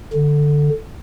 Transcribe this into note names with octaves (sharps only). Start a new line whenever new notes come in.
D3